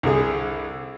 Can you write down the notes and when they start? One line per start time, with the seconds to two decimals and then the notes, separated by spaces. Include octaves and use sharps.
0.03 C2 D3 G#4